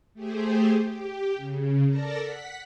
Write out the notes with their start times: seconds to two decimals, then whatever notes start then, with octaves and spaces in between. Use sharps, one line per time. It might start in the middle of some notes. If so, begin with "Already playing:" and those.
0.14 A3 G4 G#4 C5
0.85 G4
1.36 C#3
1.87 A4 A#4 D5 A5 A#5
2.20 F#5 B6